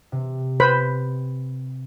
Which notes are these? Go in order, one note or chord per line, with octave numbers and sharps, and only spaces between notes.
C3
B4 C5 B5